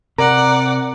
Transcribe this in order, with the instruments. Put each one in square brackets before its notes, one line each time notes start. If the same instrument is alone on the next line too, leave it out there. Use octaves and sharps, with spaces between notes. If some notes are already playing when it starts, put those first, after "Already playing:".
[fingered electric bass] C3 [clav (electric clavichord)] A#4 [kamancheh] D5 F#5 [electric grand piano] A#5